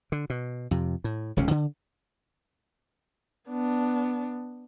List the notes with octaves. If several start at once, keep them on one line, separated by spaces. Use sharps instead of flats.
D3
B2
F2 C3
A2
D#1 C#2 C3 C#4
D3
B3 D4